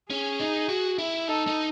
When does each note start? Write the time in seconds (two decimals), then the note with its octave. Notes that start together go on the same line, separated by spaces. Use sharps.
0.10 C#4 G#4
0.40 D#4
0.69 F#4
0.98 E4
1.28 D#4 A4
1.47 D#4